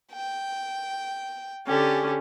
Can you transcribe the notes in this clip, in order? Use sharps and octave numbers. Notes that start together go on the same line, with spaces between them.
G5
D3 C#4 G4 G#4